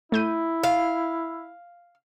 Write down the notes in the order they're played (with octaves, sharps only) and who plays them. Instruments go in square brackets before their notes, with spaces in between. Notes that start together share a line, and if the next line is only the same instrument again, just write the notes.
[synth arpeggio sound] A3 G6 D#7 [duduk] E4
[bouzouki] F5